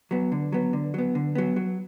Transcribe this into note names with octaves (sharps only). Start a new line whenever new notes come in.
F#3 B3
D3
F#3 B3
D3
F#3 B3
D3
F#3 B3
F#3